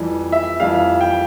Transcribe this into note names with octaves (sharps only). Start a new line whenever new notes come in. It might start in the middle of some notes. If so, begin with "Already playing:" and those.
Already playing: F2 E3 G3
E5
F2 E3 G3 F5
G5